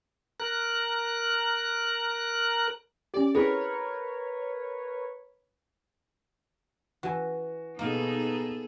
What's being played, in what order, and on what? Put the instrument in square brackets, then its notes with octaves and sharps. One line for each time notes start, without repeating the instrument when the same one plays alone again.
[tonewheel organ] A#4 F#6
[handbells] C#4 G4 [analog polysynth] D5
[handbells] C4 E4 G#4 [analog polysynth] A#4 B4 C#5
[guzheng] E3 [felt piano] F#4 G#5
[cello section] B2 D#4 [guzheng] A#3 [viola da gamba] B3 G#4 A4